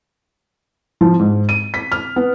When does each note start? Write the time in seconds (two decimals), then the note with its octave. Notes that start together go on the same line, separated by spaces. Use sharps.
1.01 F3
1.19 G#2
1.49 D#7
1.74 B6
1.92 F6
2.16 B3